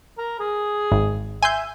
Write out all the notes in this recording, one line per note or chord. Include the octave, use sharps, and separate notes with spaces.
A#4
G#4
G#1
E5 G#5 C6 G6